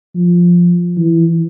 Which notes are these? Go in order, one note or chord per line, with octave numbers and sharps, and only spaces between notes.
F3
E3